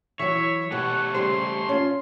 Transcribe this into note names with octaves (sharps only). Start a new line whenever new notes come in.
E3 F#3 C#5 E5
B2 A3 G4 C#5 F#5
C#3 G3 C5 C6
C#4 F4